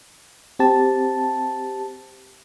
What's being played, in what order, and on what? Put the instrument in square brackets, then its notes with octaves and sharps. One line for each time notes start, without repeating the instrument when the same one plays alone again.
[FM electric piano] C4 G4 A5